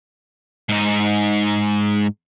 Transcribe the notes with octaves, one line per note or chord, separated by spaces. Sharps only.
G#2 D#4